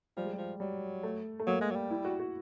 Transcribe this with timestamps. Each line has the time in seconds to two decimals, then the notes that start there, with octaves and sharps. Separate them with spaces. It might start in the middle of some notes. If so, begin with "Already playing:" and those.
0.17 F3 G3
0.24 G#3
0.33 G3
0.38 F3
0.60 F#3 G3
1.03 A3
1.40 A3
1.47 F#3 A#3
1.61 G#3
1.71 F#3
1.76 G3
1.90 E4
2.05 F#4
2.20 F#4